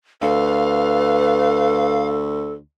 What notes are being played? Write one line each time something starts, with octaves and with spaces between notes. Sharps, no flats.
D2 A4 B4 F5